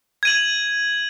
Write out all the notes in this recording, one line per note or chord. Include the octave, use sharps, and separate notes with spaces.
G#6 D#7 F#7